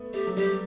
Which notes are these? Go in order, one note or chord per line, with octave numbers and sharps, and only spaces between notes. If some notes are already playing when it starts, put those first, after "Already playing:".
Already playing: A3 B3
A3 G4
F#3
G3 G4